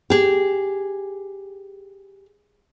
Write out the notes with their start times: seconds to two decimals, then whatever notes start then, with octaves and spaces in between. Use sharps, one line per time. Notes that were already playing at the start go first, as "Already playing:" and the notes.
0.10 G4 G#4